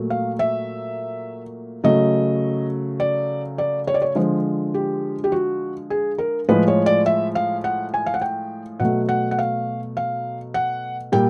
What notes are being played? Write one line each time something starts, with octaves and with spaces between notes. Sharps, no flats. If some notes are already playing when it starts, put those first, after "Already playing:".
Already playing: A#2 F#3 A3
F5
E5
C#3 F#3 A3 D#5
D5
D5
C#5
D5
C#5
D3 F3 G#3 C5
G4
G4
F#4
G#4
A#4
A2 F3 G#3 B4
C#5
D5
E5
F5
F#5
G#5
F5
F#5
G5
B2 F#3 A3 F#5
F#5
F#5
F5
F5
F#5
A#2 G3 G5